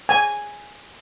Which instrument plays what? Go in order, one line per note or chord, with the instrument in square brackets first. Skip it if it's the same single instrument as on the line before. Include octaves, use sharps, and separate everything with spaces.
[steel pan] G#5